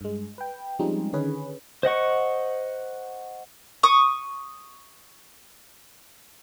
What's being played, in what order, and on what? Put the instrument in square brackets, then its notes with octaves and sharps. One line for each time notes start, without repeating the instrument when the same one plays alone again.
[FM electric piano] G2 G#3
B4 G5
F3 G3 G#3 C4 C#4 D#4
D3 D#3 C#4 G#4 B4
[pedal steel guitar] C5 D#5 F#5 C#6
[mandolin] C#6 D#6